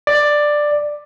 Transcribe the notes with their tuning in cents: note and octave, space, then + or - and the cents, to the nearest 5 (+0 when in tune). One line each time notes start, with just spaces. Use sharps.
D5 +10